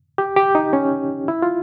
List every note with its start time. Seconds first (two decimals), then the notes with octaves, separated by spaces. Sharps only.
0.18 G4
0.36 G4
0.55 D#4
0.73 C#4
1.28 E4
1.42 F4